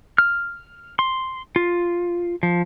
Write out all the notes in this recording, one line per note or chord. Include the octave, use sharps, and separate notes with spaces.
F6
C6
F4
F3